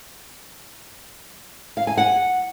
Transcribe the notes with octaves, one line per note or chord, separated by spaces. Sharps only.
F5
G#5
F#5